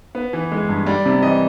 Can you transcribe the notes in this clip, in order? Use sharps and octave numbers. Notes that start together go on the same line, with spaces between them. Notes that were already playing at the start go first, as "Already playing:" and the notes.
B3
E3
G#3
G2
G3 D5
C3
E3 D#5